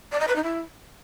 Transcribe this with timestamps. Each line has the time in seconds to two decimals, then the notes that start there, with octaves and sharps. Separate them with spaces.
0.12 D5
0.20 D#5
0.27 B4
0.35 D#4
0.43 E4